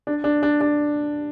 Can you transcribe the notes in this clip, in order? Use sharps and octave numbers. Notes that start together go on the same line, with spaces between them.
D4
D4
D4
D4